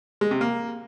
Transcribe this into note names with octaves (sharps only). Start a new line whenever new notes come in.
G#3
C3
A#3